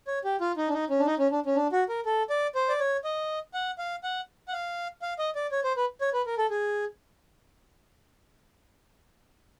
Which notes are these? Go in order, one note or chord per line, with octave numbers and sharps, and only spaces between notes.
C#5
G4
F4
D#4
D4
D#4
C#4
D4
D#4
C#4
D4
C#4
D4
F#4
A#4
A4
D5
C5
D5
C#5
D#5
F#5
F5
F#5
F#5
F5
F5
D#5
D5
C#5
C5
B4
C#5
B4
A#4
A4
G#4